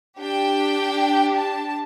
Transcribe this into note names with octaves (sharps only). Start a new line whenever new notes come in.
D4 G4 G5
A5